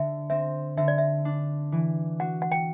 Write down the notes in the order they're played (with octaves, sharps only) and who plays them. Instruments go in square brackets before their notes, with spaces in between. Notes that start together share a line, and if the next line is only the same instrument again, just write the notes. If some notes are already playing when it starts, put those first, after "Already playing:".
Already playing: [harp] D3 [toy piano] E5
[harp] C4 [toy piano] E5
[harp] D3 [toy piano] E5
[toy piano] D5
E5
[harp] D4
E3
[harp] F#4 [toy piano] F#5
[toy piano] F#5
G5